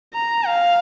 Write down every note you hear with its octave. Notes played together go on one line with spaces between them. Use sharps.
A#5
F5